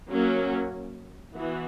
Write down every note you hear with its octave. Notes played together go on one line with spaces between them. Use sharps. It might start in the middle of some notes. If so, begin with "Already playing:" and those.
F#3 A#3 C#4
E3 B3 F#4